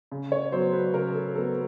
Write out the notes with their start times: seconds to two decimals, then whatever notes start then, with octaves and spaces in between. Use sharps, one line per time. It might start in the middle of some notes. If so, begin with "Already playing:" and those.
0.12 C#3
0.32 C#5
0.52 F#3 B3 C5
0.73 B4
0.94 C#3 A#4
1.14 A4
1.35 F#3 B3 A4